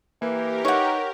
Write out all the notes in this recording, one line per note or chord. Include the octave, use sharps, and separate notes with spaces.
E3 A#3 G4 A#4
D#4 B4 C#5 F#5